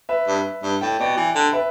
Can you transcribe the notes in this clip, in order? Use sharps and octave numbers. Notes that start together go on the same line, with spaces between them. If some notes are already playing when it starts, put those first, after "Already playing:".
B4 E5
G2
G2
A2 G5
B2 D5 G5
E3
D3
B4 E5